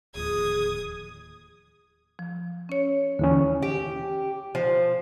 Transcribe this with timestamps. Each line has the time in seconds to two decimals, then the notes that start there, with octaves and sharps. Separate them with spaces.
0.15 D1 D#2 F3 G#4 D#6 G#6
2.19 F3
2.69 C#4 C#5
3.19 D#2 D3 E3 C#4
3.62 G4
4.55 F3